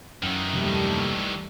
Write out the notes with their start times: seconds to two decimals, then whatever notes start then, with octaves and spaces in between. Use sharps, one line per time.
0.23 F#2 D#3 E3
0.53 D#2 C3 F3 G3 A3 A#3